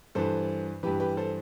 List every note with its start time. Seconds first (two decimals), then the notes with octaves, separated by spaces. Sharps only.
0.15 G2 E3 A4 C5
0.83 G2 E3 G4 B4
1.00 G4 B4
1.17 A4 C5